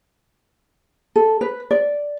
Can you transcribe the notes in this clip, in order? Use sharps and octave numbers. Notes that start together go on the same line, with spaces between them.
A4
B4
D5